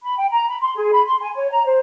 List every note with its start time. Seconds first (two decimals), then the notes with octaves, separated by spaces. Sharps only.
0.03 B5
0.18 G5
0.31 A#5
0.48 B5
0.60 C6
0.76 G#4
0.93 B5
1.05 C6
1.21 G#5
1.35 C#5
1.50 A#5
1.65 C5